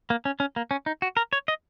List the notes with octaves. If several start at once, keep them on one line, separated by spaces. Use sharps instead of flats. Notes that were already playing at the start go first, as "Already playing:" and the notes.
A#3
C#4
C#4
A#3
C#4
D#4
F#4
A#4
C#5
D#5